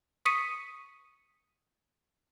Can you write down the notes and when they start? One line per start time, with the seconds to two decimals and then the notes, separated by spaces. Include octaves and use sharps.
0.25 C#6 D#6 B6 C#7 D#7